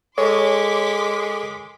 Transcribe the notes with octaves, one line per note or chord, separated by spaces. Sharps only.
G#3 A4 A#4 C#5 C6 D6 B6